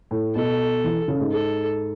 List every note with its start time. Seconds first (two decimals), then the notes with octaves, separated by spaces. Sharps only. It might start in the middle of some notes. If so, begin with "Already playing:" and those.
0.11 A2
0.35 B2 A4
0.84 E3
1.08 C#3
1.20 G#2
1.32 A4